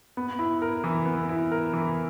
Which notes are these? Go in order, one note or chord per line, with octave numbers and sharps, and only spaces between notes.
B3
E4
A#4
E3
B3
E4
A#4
E3